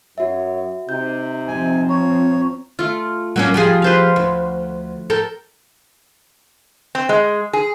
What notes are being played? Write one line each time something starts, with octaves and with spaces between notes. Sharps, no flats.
F#2 F#4 C#5 E5
C3 D#4 G6
F3 C4 G#5
C#5 A#5
A3 F4
F#3 A#3 C#4
F3 G4 G#4
B4 C5 F5
D2
A4 A#4 G5 A5
C4
G#3
G#4